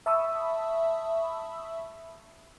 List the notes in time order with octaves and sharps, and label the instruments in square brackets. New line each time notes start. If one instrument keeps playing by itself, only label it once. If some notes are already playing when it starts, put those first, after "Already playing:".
[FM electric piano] E5 A5 B5 C#6 D#6 E6